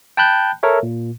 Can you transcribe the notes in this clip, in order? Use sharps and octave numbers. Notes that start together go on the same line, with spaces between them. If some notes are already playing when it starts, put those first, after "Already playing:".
G5 A5 B5 F#6 G6
A4 A#4 C#5 E5
A#2